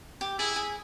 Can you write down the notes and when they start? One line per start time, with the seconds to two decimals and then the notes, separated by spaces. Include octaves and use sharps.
0.21 G4
0.39 E4 G#4
0.56 G#4